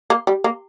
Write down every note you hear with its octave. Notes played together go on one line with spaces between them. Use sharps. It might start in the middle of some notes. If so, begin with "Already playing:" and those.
A#3
G3
A#3